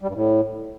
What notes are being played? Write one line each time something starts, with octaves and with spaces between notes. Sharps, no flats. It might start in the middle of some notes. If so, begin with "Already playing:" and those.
G3
G2
A2